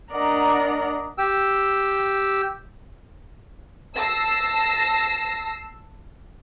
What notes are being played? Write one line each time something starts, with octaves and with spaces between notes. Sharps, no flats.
D4 A#4 D5 D#5 F#5 A#5
G4 G5 E6
A5 E6 A#6 C7